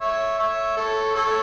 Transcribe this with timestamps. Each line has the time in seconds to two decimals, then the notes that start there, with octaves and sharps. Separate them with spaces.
0.01 C#5 E5
0.38 C#5 E5
0.77 A4 C#5
1.15 A4 C#5